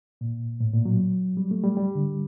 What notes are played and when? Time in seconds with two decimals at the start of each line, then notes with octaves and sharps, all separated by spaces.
0.21 A#2
0.60 A2
0.73 A#2
0.85 F#3
1.37 G3
1.51 A3
1.63 G3
1.77 G3
1.95 D3